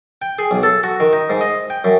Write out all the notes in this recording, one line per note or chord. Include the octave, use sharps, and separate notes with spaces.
G5
G#4
B1
A4
F#4
D#3
D#4
G#2
D#5
G5
F#2